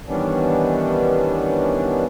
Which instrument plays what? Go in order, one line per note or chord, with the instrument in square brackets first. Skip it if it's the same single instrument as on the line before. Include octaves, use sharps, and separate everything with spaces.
[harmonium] D#3 E3 G3 B3 C#4 D4